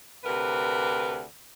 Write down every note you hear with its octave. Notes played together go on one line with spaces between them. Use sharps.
D2 C3 A#4 B4